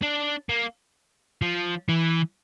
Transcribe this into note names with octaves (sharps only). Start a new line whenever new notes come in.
D4
A#3
F3
E3